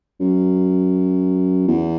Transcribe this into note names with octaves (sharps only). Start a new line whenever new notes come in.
F#2
E2